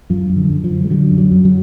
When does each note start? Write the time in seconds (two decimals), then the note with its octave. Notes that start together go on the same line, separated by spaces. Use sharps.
0.10 F#2 F3
0.30 F#2
0.36 D3
0.50 F#2
0.64 F3
0.71 D3
0.84 G#3
0.90 D3 F#3
1.11 F#2
1.18 F#3
1.32 F#2
1.45 F#3